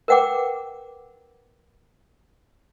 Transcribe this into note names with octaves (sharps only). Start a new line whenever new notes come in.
A#4 B4 F#5 G5 D6